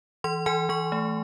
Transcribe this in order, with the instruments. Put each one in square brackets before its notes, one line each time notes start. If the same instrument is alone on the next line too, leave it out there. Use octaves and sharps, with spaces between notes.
[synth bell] E3 C6
E3 G#5
E3 C#6
A3